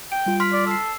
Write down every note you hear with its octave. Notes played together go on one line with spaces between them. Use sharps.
G5 D7
G3 F4
C6 F6 B6
D5
A4 E6 C7